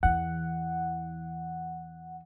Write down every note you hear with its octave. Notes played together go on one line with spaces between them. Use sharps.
E2 E3 F#5